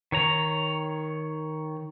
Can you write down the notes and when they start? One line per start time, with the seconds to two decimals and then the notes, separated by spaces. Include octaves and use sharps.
0.12 D#3 C#5 A#5